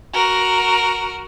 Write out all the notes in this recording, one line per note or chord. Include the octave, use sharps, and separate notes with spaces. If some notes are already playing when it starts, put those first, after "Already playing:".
F#4 A#4